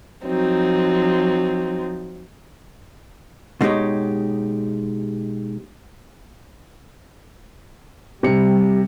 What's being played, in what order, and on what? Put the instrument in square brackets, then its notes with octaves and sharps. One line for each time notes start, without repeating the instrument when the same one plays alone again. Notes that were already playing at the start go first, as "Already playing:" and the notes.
[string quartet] F3 F#3 C4 D#4
[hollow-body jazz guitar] B2 G#3 D#4 G4 C#5
[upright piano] C3 C#7 [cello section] G3